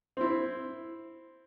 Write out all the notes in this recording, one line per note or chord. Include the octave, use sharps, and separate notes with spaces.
C4 E4